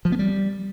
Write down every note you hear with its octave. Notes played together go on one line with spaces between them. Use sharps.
F3
B3
G3